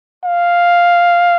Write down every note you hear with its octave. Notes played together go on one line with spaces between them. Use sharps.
F5